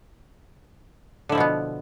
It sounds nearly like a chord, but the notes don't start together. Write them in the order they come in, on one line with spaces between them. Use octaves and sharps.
D3 E4 F3 B2 B3